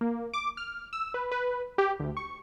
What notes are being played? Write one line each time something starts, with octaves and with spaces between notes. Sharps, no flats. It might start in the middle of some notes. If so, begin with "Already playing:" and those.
A#3
D6
F6
E6
B4
B4
G4
D2
C#6